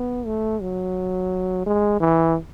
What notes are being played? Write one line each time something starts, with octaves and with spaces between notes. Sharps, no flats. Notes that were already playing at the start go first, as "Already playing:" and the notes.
Already playing: B3
A3
F#3
G#3
E3